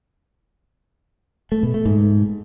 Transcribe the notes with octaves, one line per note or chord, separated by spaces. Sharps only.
A3
B2
A3
G#2